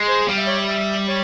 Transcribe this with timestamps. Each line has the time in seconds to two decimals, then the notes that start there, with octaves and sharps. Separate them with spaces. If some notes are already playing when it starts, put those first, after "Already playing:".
Already playing: G#3
0.08 C5
0.28 G3 F5
0.38 E5
0.47 C#5
0.57 E5
0.68 E5
1.08 C#5